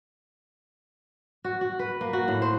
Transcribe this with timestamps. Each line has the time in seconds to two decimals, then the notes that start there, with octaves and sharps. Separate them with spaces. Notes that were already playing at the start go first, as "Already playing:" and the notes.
1.45 F#4
1.61 F#4
1.79 B4
2.01 A#3
2.13 F#4
2.28 A2
2.42 C5